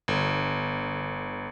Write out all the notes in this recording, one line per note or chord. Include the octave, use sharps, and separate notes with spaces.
G1